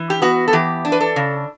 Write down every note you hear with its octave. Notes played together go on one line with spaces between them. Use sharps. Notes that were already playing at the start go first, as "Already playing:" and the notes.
Already playing: E3
G4
B3 F#4
A4
E3 G4
D4
B4
A4
C#3